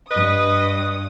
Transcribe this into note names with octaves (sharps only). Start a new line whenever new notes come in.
G2 B4 D#5 D#6